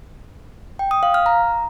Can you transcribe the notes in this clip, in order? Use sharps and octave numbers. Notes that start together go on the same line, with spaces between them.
G5
D#6
F5
F6
A#5